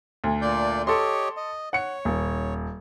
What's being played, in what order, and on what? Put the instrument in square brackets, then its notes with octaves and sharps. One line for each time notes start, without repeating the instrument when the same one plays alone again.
[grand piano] D2
[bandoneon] A#2 D5 G6
[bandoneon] G4 C#5 D#5 [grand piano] A4 C6
[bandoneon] D#5
[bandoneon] C#5 [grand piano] F#5 C#7
[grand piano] D#1